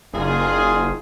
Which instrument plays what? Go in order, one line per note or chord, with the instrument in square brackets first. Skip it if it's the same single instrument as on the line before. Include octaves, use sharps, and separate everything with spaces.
[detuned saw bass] F#1 [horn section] D#4 F4 G#4